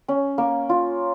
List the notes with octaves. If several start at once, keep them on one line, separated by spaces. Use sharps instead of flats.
C#4
A#3
F4